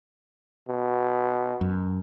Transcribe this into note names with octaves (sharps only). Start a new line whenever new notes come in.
B2
F#2